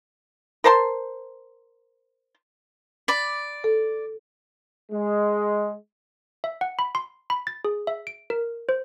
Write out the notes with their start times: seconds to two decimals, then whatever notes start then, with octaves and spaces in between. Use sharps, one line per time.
0.64 A#4 C5 A5 C6
3.08 D5 B5
3.64 A4
4.92 G#3
6.44 E5
6.61 F#5
6.79 B5
6.95 C6
7.30 B5
7.47 A6
7.65 G#4
7.87 E5
8.07 D7
8.30 A#4
8.69 C5